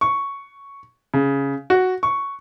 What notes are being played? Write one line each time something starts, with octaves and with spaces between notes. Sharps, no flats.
C#6
C#3
F#4
C#6